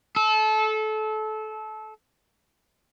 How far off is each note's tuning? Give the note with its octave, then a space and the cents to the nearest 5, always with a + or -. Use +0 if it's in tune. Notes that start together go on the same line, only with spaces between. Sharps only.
A4 -25